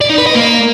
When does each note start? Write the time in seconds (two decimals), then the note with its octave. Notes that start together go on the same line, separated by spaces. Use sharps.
0.01 D5
0.09 D#4
0.18 B4
0.26 D#5
0.35 A#3